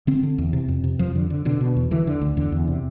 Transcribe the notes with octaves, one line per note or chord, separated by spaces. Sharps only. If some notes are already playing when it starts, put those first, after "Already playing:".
D3 C4
D3
E2
C3
F2
C3
F2 F3
D3
D3
B2 D3
B2
E2
D3 E3
D3
D2
E2 D3
E2
C3